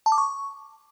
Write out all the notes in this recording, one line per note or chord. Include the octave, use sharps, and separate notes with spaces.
A5
D6
C#6